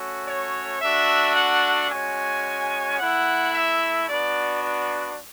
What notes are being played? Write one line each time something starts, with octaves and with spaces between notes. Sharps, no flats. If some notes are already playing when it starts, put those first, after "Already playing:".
Already playing: A3 C#4 F#4
C#5
A3 D4 F#4 E5
F#5
G#3 C#4 F#4 G#5
A3 E4 F#5
E5
B3 D4 F#4 D5
D5